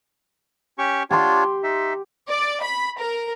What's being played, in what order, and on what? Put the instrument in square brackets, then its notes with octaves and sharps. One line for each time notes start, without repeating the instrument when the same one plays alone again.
[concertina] C#4 G4 C#6
[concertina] D4 F4 C#5 [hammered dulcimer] G4 C6
[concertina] D#4 E5
[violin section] D5
B5
A#4